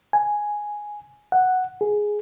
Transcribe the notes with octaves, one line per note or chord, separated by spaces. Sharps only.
G#5
F#5
G#4